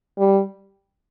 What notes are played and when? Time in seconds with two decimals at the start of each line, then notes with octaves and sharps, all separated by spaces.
0.18 G3